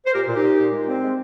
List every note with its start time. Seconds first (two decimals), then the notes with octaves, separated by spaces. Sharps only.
0.05 C5
0.13 A#2 G4 A#4
0.27 A#2
0.35 D#4 G4
0.42 A#2
0.58 A#2
0.72 G#3
0.87 C4
1.02 G#3